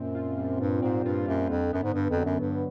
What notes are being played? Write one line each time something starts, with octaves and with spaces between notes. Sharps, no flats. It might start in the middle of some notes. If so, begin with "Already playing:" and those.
Already playing: F#2 A#2 C4
F4
G3
G2 A#2
G#2 C4
G2 F4
F#2 G3
F2 D3
F#2 B3
G#2
G2 D3
F2
F#3
F#2
G2 D3